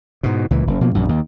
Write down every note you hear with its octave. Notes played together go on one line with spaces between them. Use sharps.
G#2 B2
C#2 A#2 E3
F#1
B2 F3 A#3
A#1 F#2
D#2